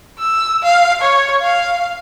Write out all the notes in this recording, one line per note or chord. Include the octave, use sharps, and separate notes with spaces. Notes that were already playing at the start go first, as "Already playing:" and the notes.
E6
F5
C#5
F5